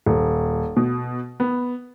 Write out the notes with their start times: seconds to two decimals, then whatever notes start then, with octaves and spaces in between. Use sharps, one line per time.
0.06 D#1
0.77 B2
1.40 B3